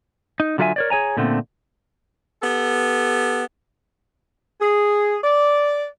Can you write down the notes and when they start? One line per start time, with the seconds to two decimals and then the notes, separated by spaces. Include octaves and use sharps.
0.40 D#4
0.58 D3 F#3 F4 G4 E5 G#5
0.76 A#4 C#5 D5
0.90 G#4 C#5 G#5 A#5
1.17 A#2 D3 A3 B3 C4
2.41 B3 G4 A4
4.61 G#4
5.24 D5